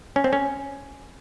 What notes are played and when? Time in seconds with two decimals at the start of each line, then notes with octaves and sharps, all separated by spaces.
0.16 C#4
0.24 C4
0.33 C#4